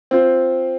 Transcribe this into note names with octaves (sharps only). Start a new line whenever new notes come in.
C4 F4 C5